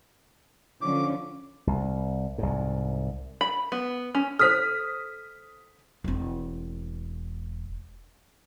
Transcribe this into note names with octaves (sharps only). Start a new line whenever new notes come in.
D3 F3 C#4 D6
C2
C2 G#2
B5
B3
C#4
A4 C5 D#6 F6 B6
E1 C4